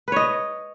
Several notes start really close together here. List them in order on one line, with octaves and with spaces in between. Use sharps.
B4 C#5 D#5